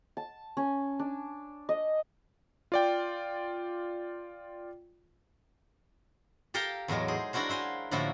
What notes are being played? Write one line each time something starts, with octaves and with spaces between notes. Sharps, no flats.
A5
C#4
D4
D#5
F4 D5 G5
G4 A4 A#4 F5 G5 A#5
E2 A2 F#3 G#3 A#4
D#4 G#4 C5
D4 E4 F#4 A#4 C5
E4 C5 F5 G#5
A2 D3 F3 A#3 E4 F#4